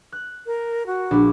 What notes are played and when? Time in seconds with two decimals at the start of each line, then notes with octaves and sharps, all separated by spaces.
0.12 F#6
0.46 A#4
0.86 F#4
1.11 A#1 D4 B5